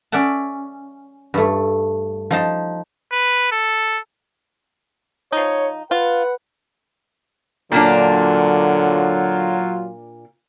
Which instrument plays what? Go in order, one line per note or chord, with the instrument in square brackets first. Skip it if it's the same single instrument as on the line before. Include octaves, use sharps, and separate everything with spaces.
[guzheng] C#4 D5 E5 F#5 A5
G2 A3
F3 D#4 A5
[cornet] B4
A4
[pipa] F3 D#4 [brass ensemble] C#5
[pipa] F4 [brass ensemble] B4 F#5
[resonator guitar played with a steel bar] A#2 A#3 D4 [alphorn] D3 [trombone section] F#3 F4